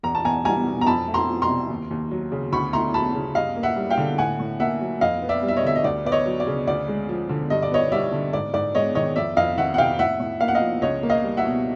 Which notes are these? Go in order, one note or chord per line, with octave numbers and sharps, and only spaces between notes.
E2 A#5
A5
E2 G#5 A#5
G3 G#5 A#5
B2
A#5
F2 A5 B5
A3
A#5 C6
F3
A#5 C6
C3
D#2
D#2
F#3
C#3
D2 B5 C#6
A3 A#5 C6
F#3 A5 B5
C#3
G2 D#5 F5
A#3
E5 F#5
G3
F5 G5
D3
A2 F#5 G#5
A2
A#3 E5 F#5
F#3
F2 D#5 F5
B3
D5 E5
G3
E5
C#5 D#5
D3 E5
D#5
D2 D5
B3 D5
C#5 D#5
F#3
D5
C#3
D2 D5
G#3
F3
D3
G2 D#5
D5
B3 C#5 D#5
G3 D5 E5
D3
G#2 D5
G#2 D5
G#3 C#5 D#5
D#3 C#5 D#5
F2 D5 E5
F2 D#5 F5
D#3 E5 F#5
F#5
C3 F5 G5
A2 E5 F#5
A2
A#3 F5
F#5
D#5 F5
F3
C#2 C#5 D#5
A#3
D#5 F5
G3
E5 F#5
B2